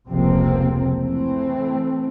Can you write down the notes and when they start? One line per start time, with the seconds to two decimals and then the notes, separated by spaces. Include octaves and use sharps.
0.10 F1 C#2 C3 F3 A#3 C4
0.97 E3 A3 C4